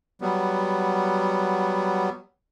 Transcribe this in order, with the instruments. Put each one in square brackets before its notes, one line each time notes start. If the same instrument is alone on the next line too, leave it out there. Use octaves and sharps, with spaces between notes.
[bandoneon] F#3 G3 B3